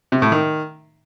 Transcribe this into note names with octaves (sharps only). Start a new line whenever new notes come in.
C3
A2
D#3